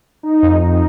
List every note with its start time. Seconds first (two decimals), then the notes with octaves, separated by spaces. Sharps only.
0.23 D#4
0.42 F2
0.60 D#4